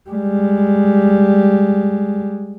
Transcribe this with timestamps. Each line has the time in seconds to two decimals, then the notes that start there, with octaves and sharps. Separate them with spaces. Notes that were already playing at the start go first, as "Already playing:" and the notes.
0.10 G3 G#3